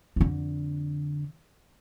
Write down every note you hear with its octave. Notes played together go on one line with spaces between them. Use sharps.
F2 D3